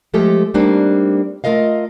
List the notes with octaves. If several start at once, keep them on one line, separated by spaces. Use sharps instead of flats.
F3 G#3 A3 G4 A4
G3 A3 A#3 C4 D4 D#4
A3 F4 A#4 D#5 F5